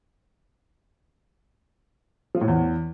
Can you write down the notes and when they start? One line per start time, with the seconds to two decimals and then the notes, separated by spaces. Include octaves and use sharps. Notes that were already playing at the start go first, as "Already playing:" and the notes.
2.35 F3
2.41 A2
2.48 E2